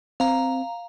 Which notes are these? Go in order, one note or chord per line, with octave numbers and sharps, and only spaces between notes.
C4 F5 A#5